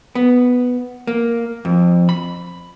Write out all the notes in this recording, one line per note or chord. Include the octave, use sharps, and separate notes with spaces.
B3
A#3
F2
B5